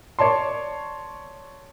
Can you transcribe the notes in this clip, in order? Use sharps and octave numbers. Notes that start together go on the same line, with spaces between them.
C#5 D5 A5 C6